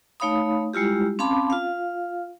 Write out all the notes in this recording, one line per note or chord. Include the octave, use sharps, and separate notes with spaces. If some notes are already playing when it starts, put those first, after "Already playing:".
A3 D#4 C#5 F5 B5 D#6
G3 G#3 E4 F4 G4
C4 C#4 F5 A5 B5 D6
F4 F5